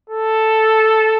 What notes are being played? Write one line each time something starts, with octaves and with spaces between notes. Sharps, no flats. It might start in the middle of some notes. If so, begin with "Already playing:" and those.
A4